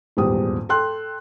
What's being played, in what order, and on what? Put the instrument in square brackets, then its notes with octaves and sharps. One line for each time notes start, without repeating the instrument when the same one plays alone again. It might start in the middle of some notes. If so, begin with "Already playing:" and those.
[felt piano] D#1 E2 G#2 G3 G4 D#6
A4 G5 C6 F#6